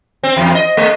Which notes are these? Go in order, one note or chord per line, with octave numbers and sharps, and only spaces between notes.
C4
E2
D#5
G#3